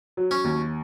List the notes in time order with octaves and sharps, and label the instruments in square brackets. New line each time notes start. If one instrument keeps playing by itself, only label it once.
[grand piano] F#3
[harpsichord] C#4
[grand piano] D#2